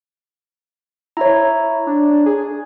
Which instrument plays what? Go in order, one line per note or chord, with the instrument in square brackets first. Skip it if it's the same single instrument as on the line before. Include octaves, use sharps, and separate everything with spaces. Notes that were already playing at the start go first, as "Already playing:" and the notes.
[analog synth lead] E4 [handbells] C#5 A#5
[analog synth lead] D4
G#4